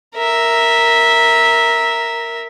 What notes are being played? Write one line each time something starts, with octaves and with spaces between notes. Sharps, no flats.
A#4 E5